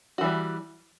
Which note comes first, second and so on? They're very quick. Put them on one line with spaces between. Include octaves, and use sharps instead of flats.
F#4 E3 G3